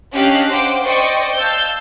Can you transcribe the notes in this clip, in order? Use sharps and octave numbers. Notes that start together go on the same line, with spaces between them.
C#4 D4 G4 D#5 F5 F#6
C5 F#5 G5 D6
C5 D5 D#5 G5 C#6
F5 A5 E6 G6